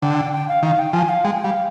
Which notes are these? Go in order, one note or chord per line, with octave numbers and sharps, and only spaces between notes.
D3 G5
G5
G5
F5
D#3 F5
G5
F3 G#5
F5
G#3 G5
G3 F5